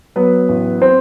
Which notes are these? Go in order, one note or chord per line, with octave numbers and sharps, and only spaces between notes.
F#3 B3 B4
A1
C4 C5